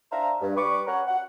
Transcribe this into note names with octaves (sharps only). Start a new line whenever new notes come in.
D4 C5 E5 F5 A#5
G2
G3 B4 C#6 D6
C#4 A#4 C#5 F#5
F#5